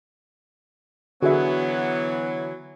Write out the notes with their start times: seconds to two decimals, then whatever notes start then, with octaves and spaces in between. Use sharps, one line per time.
1.22 D3 E3 F#3 B3 F#4 G#4 E5